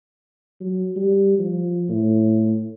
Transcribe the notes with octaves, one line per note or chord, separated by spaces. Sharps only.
F#3
G3
F3
A2